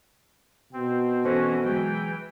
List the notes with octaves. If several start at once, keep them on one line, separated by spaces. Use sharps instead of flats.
B2 C4
E3 C4 C#4 F#4 A4 C5
E3 F#3 G#3 G5